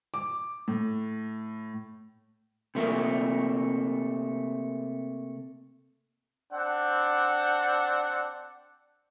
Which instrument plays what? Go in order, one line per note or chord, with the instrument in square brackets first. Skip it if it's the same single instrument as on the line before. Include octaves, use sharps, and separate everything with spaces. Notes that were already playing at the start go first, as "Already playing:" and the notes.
[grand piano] D6
A2
[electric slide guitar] C3 A3 A#3
[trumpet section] C4 D4 F#5